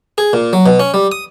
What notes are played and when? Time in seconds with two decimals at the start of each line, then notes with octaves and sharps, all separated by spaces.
0.18 G#4
0.33 A#2
0.53 F#3
0.66 B2
0.80 C#4
0.94 G3
1.12 D#6